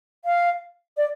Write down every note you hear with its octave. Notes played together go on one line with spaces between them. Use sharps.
F5
D5